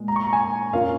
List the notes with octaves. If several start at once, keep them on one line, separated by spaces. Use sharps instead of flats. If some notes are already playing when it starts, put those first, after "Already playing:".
Already playing: A#2 G#3
A#5
C#6
A#5
G#5
A#2 A#3 C#4 F4 F5